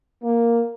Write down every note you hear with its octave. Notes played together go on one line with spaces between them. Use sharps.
A#3